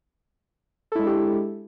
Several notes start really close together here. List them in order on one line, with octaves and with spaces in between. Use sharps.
A4 E4 G#3 D4 G4